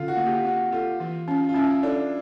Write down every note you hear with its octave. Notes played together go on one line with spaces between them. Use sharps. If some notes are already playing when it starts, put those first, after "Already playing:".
Already playing: D3 C#4 F4
F#4
A#3
G4
C4 F#4
F4 A4
E3 F4
C#4 F4
F4
C#4 E4
D4 A4